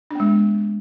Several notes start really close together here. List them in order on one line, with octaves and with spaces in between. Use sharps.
D4 B3 G#3